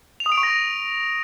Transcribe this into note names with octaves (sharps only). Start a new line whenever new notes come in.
F7
D#6
D7
C#6
A#6